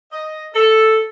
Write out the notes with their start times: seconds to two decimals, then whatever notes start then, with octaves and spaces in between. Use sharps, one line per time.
0.13 D#5
0.55 A4